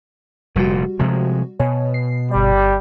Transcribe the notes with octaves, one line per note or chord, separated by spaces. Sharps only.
F1 A#2 G3 F#4
C3 F3 G#3
B2 C#5 G#5
C7
G1 G3 D5